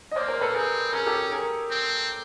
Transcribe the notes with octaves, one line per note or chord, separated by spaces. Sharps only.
D#5
A#3 C5 D5
A#4 C5
A4 B4
C4 G#4 A#4
C#4 G#4 A#4
G4 A4
G#4 A#4
C4